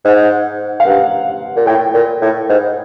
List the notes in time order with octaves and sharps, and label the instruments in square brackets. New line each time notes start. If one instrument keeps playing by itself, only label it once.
[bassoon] G#2 [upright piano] F#5
[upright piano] F5
[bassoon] G2 [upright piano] F#5
[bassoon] A#2
[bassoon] A2 [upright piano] G5
[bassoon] A#2
A2
G#2